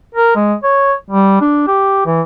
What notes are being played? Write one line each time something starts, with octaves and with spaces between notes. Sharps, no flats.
A#4
G#3
C#5
G3
D4
G4
E3